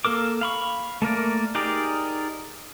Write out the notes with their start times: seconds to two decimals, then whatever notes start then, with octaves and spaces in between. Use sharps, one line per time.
0.05 A#3 A4 A#4 D6
0.41 F5 B5 C#6
1.02 A3 A#3 A#4 D5
1.55 D#4 G4 G#4 A#4 D5